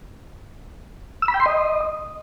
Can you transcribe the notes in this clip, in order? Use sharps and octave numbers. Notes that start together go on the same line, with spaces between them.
E6
B5
G5
C6
D#5